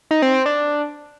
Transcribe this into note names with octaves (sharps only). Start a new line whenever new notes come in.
D#4
C4
C4
D4